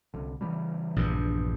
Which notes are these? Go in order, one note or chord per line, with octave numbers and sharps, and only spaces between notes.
C2 D3
C#3 E3 G3
A#1 E2 G2